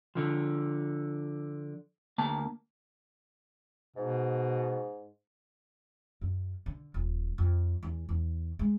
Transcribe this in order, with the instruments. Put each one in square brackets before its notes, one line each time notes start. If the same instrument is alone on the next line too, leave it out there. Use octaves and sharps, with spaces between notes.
[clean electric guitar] D3 F3
D2 A#3 A5
[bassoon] G#2 [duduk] B2
[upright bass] F#2
D3
D#1
F2
E2
E2
G#3